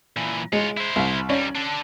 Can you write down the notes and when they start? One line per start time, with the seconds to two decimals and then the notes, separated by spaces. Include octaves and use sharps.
0.16 A#2 E3
0.53 G#3 F4 C#5
0.77 E4 C5
0.96 C2
1.29 D#2 G3 C#4 C#5 D5
1.55 D4 A4